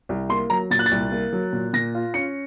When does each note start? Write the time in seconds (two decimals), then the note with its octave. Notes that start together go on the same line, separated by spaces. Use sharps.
0.09 C2
0.29 A#3 C6
0.50 F#3 A#5
0.71 A#2 A6
0.79 F#6
0.86 A6
0.91 C2
1.12 A#3
1.33 F#3
1.53 A#2
1.73 A#2 A#6
1.95 F4
2.14 C#4 C#7